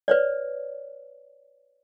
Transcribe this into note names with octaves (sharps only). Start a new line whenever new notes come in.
B4 C#5 D5